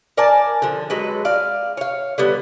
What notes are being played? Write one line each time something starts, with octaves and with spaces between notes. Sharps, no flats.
A#4 D5 G#5 A5
D3 F3
F#3 G#3 A4 B4
D5 F5
C#5 F5
D3 G3 B3